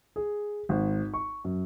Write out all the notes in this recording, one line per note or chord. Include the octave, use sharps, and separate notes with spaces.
G#4
G#1
C#6
F#2